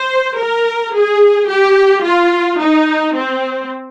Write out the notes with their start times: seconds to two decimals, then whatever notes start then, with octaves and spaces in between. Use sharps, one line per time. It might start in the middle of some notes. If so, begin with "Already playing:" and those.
Already playing: C5
0.39 A#4
0.95 G#4
1.49 G4
2.05 F4
2.61 D#4
3.16 C4